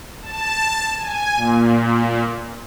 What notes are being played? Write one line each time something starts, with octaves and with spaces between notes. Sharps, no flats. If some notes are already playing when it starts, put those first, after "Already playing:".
A5
G#5
A#2